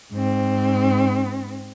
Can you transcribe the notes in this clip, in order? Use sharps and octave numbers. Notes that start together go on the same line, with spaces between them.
G#2 C4